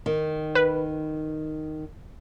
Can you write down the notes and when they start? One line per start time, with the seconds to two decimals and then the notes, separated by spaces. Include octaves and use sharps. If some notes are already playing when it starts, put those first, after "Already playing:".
0.06 D#3
0.55 B4